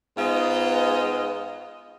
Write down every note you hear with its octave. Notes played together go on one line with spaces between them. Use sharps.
G#2 B3 F4 D#5